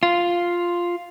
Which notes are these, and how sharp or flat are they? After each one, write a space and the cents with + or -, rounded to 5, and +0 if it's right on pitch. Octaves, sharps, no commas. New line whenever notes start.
F4 +0